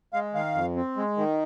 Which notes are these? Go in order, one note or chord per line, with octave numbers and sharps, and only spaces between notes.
G#3 F5
D#3 F5
F2
C4
G#3
D#3